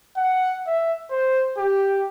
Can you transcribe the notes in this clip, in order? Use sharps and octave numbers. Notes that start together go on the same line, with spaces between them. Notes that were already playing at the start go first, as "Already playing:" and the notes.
F#5
E5
C5
G4